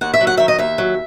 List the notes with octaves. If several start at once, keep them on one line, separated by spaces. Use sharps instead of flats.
D#2 F#5
E5
F#3
F#5
D#3 E5
D#5
D#2 E5
F#3